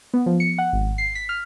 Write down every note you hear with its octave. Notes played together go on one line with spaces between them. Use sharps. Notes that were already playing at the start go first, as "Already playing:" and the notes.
B3
F3
C#7
F#5
G#1
C7
B6
F6